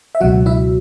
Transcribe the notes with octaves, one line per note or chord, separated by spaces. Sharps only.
E5
C#2 B2 F#3 F#4 F#5
E4 E5